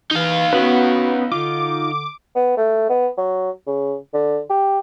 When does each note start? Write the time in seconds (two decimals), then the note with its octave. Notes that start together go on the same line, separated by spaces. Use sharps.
0.11 E3 D#4 F5
0.53 B3 C#4 F#4 B4
1.32 D3 F4 D6
2.35 B3
2.57 A3
2.89 B3
3.17 F#3
3.67 C#3
4.14 D3
4.50 G4